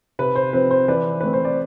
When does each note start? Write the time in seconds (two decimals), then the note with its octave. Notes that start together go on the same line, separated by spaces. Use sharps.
0.19 C3 B4
0.36 C5
0.53 F3 C4 B4
0.71 C5
0.88 E3 B4 D5
1.21 A3 C4 B4
1.33 C5
1.45 D5